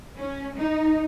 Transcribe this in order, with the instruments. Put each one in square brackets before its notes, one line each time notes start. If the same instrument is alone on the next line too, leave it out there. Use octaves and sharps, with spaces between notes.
[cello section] C#4
D#4